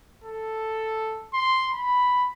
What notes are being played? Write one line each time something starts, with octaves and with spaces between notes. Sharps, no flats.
A4
C6
B5